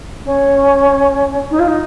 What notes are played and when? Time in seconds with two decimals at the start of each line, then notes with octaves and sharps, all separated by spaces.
0.24 C#4
1.50 D#4
1.58 F4
1.67 D#4